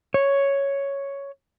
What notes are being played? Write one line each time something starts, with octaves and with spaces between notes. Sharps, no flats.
C#5